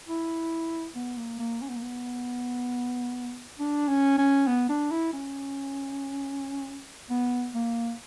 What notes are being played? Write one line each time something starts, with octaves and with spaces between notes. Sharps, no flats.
E4
B3
A#3
A#3
C#4
B3
A#3
B3
D4
C#4
C#4
B3
D4
E4
C#4
B3
A#3